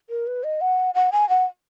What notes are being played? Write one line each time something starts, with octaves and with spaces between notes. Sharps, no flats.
A#4
B4
D#5
F#5
F#5
G#5
F#5